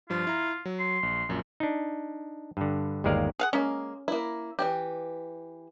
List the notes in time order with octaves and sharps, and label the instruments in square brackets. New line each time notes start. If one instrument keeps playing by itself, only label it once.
[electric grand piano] G2 F3 [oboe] F4
[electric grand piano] E4 A#5
F#3
[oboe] C6
[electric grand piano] A#1
A#1 F#2 A#2
[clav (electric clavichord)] D4 D#4
G2 D3
G1 D#2 G#3 A#4 D5 F5
[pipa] G#4 F5 F#5
[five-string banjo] G#3 A#3 [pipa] C#4
[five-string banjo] A#3 E4
E3 F#3 G4